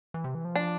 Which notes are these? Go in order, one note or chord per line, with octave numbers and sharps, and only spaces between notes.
E3
C3
E3
F3
D4